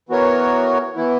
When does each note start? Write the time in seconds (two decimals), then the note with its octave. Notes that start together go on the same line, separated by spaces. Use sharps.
0.09 E3 B3 F#4 A#4 C#5
0.95 E3 B3 E4